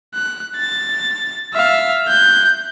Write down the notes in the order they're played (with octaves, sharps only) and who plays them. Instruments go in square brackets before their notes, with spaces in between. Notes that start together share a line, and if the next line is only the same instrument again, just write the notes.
[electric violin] F#6
A6
E5 F5
F#6 G6